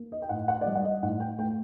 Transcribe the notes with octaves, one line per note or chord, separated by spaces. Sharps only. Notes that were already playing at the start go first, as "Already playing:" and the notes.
Already playing: A#3
D#5
G5
A2 F#5
F#5
D5
G3 D#5
F#5
D#5
A2 F#5
G5
A3 G5